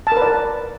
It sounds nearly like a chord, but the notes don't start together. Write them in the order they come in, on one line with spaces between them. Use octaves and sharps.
A5 A#4 B4 D5